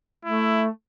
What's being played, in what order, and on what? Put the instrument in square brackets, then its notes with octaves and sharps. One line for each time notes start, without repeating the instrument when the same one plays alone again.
[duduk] A3 [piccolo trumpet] E4